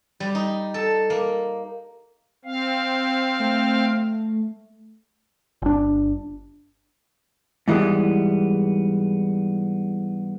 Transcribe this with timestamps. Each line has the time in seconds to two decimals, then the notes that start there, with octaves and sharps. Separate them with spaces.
0.20 G3
0.35 D#4
0.74 A4
1.10 A#3
2.45 C4 F5
3.39 A3
5.62 G1 D4
7.68 G#2 E3 G3 G#3 B3